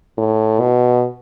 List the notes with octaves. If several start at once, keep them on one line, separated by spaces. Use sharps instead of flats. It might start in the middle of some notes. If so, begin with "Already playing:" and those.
A2
B2